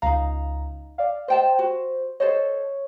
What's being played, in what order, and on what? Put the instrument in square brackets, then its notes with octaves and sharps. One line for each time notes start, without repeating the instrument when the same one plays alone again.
[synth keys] C#2 A#5 [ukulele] D#4 F5
[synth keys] D5 F5
[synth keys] C5 [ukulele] D#5 G5 A5
[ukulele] F#4
[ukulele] A4 C5 D#5 [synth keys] C#5